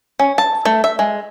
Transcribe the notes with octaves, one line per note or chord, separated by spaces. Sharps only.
C#4
A5
A3
E5
G#3